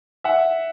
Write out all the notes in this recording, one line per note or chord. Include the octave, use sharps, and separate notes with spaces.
E5 F#5